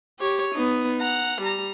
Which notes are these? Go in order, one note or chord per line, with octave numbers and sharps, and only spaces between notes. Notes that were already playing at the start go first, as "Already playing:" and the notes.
G4 C#5
B3 D#4
F#5 A#5
G3 A#5